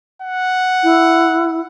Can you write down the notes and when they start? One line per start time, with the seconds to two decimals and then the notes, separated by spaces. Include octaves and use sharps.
0.22 F#5
0.83 E4